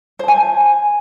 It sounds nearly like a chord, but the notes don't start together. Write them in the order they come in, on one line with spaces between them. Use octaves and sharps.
C5 A5 G#5